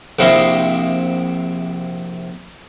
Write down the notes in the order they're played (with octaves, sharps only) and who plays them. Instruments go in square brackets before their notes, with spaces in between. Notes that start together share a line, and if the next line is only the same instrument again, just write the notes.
[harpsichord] A#1 C3 E4 D#5 F5 C#6